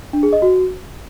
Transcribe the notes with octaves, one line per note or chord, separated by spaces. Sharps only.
D4
G#4
D#5
F#4